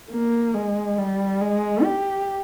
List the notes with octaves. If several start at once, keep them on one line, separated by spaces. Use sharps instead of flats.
A#3
G#3
G3
G#3
G4